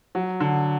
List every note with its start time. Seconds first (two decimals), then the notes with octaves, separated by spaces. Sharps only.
0.15 F#3
0.40 D3